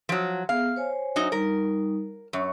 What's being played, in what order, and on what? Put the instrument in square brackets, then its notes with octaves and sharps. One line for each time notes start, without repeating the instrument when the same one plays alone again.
[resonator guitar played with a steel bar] F3 F#3
[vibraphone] B3 G#4 [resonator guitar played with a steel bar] F5
[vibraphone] C5 C#5 G#5
[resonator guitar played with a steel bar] F#3 D#4
[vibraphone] G3 D#4 [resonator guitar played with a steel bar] A#4
[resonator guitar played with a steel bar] F#2 [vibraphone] C#5 C#6